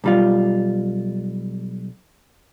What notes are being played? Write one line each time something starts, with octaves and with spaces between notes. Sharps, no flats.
B1 G3 F4